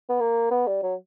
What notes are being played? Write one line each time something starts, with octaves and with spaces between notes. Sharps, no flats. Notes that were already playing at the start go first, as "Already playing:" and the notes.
B3
A#3
B3
G3
F#3